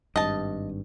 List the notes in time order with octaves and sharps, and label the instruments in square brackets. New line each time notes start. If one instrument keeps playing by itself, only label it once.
[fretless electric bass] G#1 G2 [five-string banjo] D#5 A5